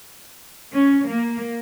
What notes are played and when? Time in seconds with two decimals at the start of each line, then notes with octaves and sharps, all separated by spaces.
0.72 C#4
1.07 A#3